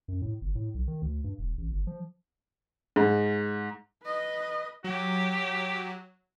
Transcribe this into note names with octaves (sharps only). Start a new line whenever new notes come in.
F#2
A2
G1
A2
B1
D#3
D2
G2
D#1
A1
G1
F3
G#2
B4 D#5
F#3 G4